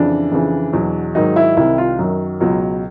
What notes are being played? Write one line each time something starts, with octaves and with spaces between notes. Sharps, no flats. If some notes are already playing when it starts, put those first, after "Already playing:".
Already playing: F2 C#3 E3 D4
F2 C#3 E3
E2 B2 F#3
G#2 D#3 F#3 D#4
E4
C2 C3 D#3 E4
F4
F#2 D#3 F#3
C#2 B2 F#3